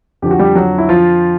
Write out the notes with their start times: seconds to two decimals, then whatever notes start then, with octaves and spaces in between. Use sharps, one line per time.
0.22 F2 D3 F3 G4
0.31 F#4
0.39 G3 G4
0.56 F#3 F#4
0.78 E4
0.89 F3 F4